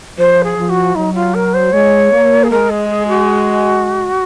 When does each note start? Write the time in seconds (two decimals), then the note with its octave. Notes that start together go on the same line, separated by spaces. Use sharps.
0.18 F3 C5
0.44 G#4
0.57 F3
0.69 F#4
0.95 F#3 D#4
1.15 F4
1.34 A#4
1.54 C5
1.73 G#3 C#5
2.12 A#3
2.43 G#4
2.51 G#3 A#4
2.70 G#4
2.89 G#4
3.08 F#4